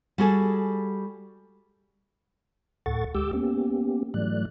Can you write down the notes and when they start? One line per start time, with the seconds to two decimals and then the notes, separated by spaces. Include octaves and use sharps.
0.18 G3 F#4 G#4 A4
2.86 D2 A2 A4 F#5 C#6 A6
3.15 D2 G#3 G4 D6 E6 G6
3.33 A#3 B3 C#4 G4
4.14 G#2 E3 F#3 A3 D5 F#6